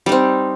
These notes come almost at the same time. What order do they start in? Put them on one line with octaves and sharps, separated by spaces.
G3 D#4 C4